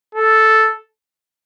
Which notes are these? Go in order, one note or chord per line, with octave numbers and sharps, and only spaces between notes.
A4